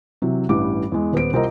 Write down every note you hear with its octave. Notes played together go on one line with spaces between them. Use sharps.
C3 E3 F#3
A1 G2 E3 G3 D6
E2 G#3
D#1 B3 C5 D7
C2 C4 F4 A#4 D#5 A#5